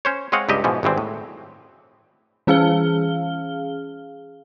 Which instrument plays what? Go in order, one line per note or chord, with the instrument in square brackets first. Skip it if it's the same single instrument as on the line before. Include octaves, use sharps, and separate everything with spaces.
[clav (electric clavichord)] C#4 C5 C#5
G#3 C4 C#5 D#5 F5 F#5
C#2 G2 G4 D#5 E5
G#2 B2 E3 F3
G#1 G2 E3 C4
A2
[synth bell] E3 C#4 G#4 F5 F6 G7